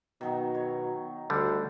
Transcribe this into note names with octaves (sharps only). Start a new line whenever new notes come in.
B2 D#3 F#3 D#4
C#5
D2 D3 G3